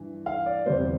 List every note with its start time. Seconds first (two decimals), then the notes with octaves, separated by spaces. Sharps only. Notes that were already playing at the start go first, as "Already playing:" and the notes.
Already playing: G2 E3
0.26 F5
0.46 D5
0.66 E2 C3 G3 C5